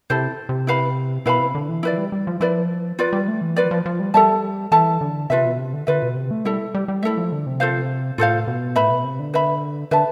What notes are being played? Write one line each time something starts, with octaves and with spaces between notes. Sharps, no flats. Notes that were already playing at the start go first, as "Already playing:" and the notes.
C3 E4 A4 C5
C3
E4 B4 F5 B5
B2 E4 B4 F5 B5
C3
D3
E3
F3 E4 B4 D5
G3
G3
F3
F3 E4 B4 D5
F4 B4 D5
G3
A3
E3
F3 F4 B4 D5
F3
F3
G3
G3 A4 E5 A5
E3 A4 E5 A5
D3
C3 F4 B4 E5
B2
C3
D3
D3 F4 B4 E5
B2
C3
A3
G3 E4 A4 E5
G3
G3
A3 E4 A4 E5
F3
D3
C3
F4 A4 C5 F5
A2 F4 A4 C5 F5
B2
A2 B4 E5 B5
B2
C3
D3
B4 E5 B5
D3 B4 E5 A5